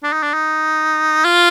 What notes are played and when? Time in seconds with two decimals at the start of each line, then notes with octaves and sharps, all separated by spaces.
0.03 D4
0.13 D#4
0.23 D4
0.34 D#4
1.24 F4